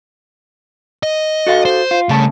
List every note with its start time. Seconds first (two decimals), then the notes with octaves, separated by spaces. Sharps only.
1.03 D#5
1.47 F#4 A4 F5
1.65 C5
1.91 F4
2.09 G2 C#3 A3 A5